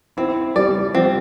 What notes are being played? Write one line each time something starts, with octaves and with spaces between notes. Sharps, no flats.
C4 E4
G3 D5
F3 C4